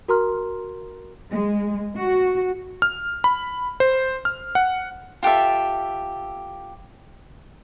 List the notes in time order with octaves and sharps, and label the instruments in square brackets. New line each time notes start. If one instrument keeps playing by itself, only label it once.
[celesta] F#4 A#4 A#5 C6 F6
[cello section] G#3
F#4
[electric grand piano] F6
B5
C5
F6
F#5
[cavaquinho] F4 G4 A4 E5